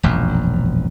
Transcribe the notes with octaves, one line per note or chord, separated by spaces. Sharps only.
E1 A#1 F#2